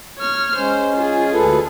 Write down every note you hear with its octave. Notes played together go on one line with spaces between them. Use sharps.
C#5 F6
G#3 C#4 C5
F4 G#4
D2 A4 B4